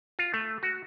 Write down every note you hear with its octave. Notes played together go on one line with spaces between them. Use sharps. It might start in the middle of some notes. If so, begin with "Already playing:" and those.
F4
A3
F#4